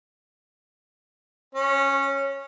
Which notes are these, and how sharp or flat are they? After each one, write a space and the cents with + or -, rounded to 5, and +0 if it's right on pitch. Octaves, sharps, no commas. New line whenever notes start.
C#4 -10